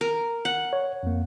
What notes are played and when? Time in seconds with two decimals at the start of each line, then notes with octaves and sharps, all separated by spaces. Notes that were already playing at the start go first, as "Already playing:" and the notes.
0.01 A#4
0.45 F#5
0.73 C#5
1.03 F2 A#3